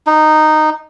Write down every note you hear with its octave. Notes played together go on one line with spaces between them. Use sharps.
D#4